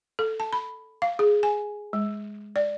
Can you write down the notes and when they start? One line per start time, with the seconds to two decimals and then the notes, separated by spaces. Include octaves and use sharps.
0.19 A4
0.40 A5
0.53 B5
1.02 F5
1.19 G#4
1.43 G#5
1.93 G#3
2.56 D5